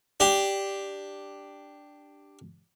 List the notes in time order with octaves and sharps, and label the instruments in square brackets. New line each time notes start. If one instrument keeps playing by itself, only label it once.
[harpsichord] D4 G4